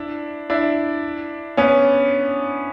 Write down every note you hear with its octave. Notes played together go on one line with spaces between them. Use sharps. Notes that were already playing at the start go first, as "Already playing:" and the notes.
Already playing: D4 E4
D4 E4
B3 C#4